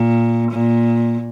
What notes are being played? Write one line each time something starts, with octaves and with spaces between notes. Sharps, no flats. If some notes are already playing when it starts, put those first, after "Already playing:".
Already playing: A#2
A#2